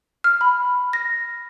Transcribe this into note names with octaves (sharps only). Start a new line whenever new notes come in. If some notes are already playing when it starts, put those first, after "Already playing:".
F6
B5
A#6